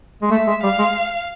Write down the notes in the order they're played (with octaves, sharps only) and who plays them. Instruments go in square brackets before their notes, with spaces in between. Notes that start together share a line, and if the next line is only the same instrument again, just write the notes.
[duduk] G#3
[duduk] A3 [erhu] E5
[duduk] G#3
[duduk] G3 [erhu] F5
[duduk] G#3